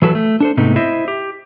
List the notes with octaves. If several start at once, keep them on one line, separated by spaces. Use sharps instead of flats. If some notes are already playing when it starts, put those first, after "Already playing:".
E3 F#3 A4 B4
A3
D4 A4 C5
G#2 C3 A3 B3 D#4
E4 C5 D#5 E5
G4